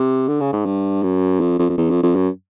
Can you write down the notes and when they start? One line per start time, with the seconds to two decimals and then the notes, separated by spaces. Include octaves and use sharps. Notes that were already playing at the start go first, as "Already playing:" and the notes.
Already playing: C3
0.28 D3
0.41 C#3
0.53 G#2
0.66 G2
1.03 F#2
1.40 F2
1.59 F2
1.70 F2
1.78 E2
1.90 F2
2.03 F2
2.15 F#2